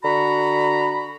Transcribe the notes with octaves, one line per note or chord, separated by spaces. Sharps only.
D3 F#4 A#5 B5